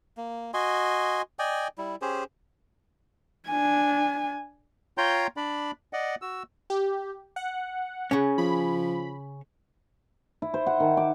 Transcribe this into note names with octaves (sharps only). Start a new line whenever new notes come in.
A#3
F#4 D#5 G#5 C6
D5 D#5 G5 G#5
G3 E4
C#4 G4 G#4 C5
D4 G#5
F4 C#5 G5 A#5 C6 G6
D4 D5 B5
D5 D#5 F#5
F#4 E6
G4
F#5
C#3 C#4
F3 B5
E4
C5
F#5
D#3
D6